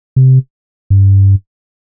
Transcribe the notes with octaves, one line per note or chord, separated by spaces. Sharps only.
C3
G2